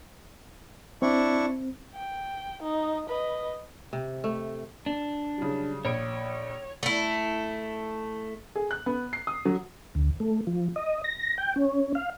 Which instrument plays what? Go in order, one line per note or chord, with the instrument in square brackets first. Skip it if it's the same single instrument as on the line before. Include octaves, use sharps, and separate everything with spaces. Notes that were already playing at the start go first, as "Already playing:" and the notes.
[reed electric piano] C4 [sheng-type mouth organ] D4 E4 C#6
[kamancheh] G5
D#4
B4 D#5
[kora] C3
A3
[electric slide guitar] D4
[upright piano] C#3 F#3 G3
[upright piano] A#1 B5 D7 [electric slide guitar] C#5
[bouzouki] A3 E4
[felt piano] G#4
F#6
B3
C7
D#6
F#3
[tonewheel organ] D2
A3
F3
D#5
A#6
G5
C#4
F5